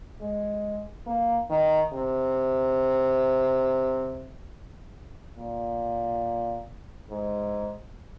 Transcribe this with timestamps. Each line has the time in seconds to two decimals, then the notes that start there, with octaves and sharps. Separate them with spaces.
0.21 G#3
1.07 A#3
1.50 D#3
1.93 C3
5.37 A#2
7.10 G#2